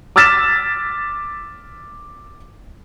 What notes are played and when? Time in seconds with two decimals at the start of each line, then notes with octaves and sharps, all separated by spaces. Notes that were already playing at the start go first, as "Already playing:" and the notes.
0.16 D6 E6 F6 A6 B6 E7